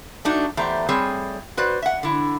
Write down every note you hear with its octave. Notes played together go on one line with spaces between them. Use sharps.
A3 D4 D#4 F#4
E2 A3 G4 C5 D5 A#5
G3 A3 C4 G#4 C#5
F#4 B4 C5 D5
E5 F#5
D3 E4